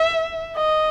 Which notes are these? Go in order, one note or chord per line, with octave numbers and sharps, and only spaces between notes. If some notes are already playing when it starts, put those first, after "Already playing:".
Already playing: E5
D#5